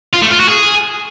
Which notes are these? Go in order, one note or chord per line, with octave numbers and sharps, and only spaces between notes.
F4
A3
F4
F#4
G#4